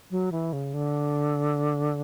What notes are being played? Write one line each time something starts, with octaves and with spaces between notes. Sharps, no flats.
F#3
E3
C#3
D3